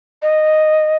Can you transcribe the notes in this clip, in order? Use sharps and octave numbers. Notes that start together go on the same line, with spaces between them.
D#5